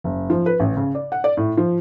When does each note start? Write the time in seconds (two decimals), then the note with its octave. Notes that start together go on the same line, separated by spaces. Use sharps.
0.04 F#1
0.30 F3
0.46 B4
0.60 A1
0.77 C#3
0.95 D5
1.12 F#5
1.24 D5
1.37 A2
1.57 F3